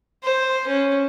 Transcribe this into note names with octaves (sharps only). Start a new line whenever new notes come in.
C5
C#4